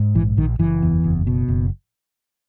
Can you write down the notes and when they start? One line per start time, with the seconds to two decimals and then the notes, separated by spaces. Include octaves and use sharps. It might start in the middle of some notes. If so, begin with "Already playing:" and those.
Already playing: G#2
0.15 A#1 E3
0.37 A#1 D#3
0.59 F#1 E3
0.82 E2
1.04 F#1
1.27 B2
1.48 F#1